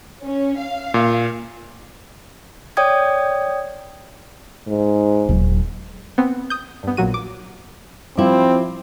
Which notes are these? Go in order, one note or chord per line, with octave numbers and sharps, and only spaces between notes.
C#4
F5
A#2
C#5 D5 G5 D#6 G#6
G#2
D#1 F#3
B3 C4
D#6 G6
G2 B3
A#1 A#2 F#3 F#4 D#7
D6
F3 G3 C4 E4 F5 D6